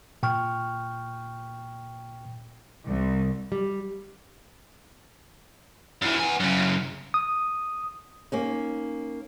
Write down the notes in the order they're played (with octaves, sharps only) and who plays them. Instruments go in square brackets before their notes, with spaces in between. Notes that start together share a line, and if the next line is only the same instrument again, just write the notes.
[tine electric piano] A#2 G5 C#6 F6
[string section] C2
[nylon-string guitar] G3
[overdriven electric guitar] F#2 E3
B3 G#5
F#2 C#3
[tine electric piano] D#6
[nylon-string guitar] A#3 C#4 D#4